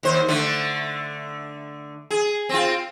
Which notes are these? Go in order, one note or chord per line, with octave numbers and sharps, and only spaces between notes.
D#2 C5
D3 A3
G#4
C4 F4